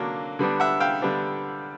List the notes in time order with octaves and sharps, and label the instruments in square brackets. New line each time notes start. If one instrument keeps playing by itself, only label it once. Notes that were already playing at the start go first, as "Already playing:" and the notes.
Already playing: [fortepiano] D3 F#3 A#3 D4
D3 G3 B3 D4
E5 F#5
F5 G5
D3 G3 B3 D4